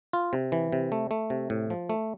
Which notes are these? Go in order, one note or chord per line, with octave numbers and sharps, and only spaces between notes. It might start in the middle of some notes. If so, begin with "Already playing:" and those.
F4
C3
E3
C3
A3
A3
C3
A2
F3
A3